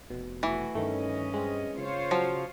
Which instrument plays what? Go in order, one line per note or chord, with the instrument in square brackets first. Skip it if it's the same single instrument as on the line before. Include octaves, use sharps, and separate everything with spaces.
[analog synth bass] F1 [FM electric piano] B2
[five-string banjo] E3 [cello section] A3 F#4
[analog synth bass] G2 [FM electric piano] D#3 A3 [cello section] C#4 D#5
[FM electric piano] G#3 C4
[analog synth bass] C#3 [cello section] F4 C5 C#5
[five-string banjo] F3 [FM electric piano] F#3 F6